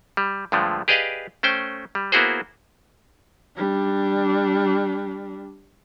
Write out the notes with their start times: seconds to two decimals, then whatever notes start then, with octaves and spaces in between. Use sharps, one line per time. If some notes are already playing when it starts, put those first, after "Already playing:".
0.17 G3
0.52 G2 D3 F3 G#3 A3
0.88 G4 G#4 B4 D5 D#5 F5
1.43 A3 C#4 C5 G5
1.95 G3
2.12 A#3 B3 E4 F#4 G#4 C5
3.57 G3 D4